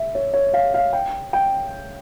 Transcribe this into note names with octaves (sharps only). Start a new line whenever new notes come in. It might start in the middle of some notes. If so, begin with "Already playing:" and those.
Already playing: E5
C#5
C#5
F5
F5
G5
G5